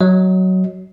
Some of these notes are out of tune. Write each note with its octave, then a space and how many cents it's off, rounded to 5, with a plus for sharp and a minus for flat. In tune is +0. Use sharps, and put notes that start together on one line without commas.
F#3 +10 D#5 +20